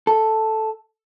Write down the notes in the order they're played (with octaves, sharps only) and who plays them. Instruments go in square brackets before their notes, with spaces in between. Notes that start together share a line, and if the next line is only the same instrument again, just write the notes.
[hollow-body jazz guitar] A4